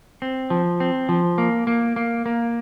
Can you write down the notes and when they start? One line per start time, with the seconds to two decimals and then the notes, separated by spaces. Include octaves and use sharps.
0.22 C4
0.50 F3
0.80 C4
1.09 F3
1.38 A#3
1.67 A#3
1.96 A#3
2.26 A#3